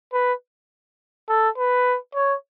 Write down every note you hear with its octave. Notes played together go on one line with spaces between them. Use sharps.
B4
A4
B4
C#5